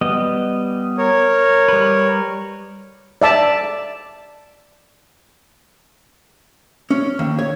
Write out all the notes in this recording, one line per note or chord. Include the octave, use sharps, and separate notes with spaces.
G3 B3 D#5
A#4 C#5
G3 B4
D5 E5 A5
C#4
D#2
C#5